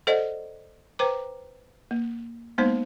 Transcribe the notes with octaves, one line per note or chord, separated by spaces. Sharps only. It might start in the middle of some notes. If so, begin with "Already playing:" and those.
A4 C5 D5 D#5 F#5
B4 C5 G5 A#5 D6
A#3
G#3 A#3 B3 D#4 C5